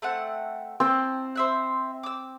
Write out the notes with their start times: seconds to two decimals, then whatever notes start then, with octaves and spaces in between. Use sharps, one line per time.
0.02 A3 C4 F#5
0.80 C4 G5 A5
1.35 C5 E5 F#6
2.03 D6 E6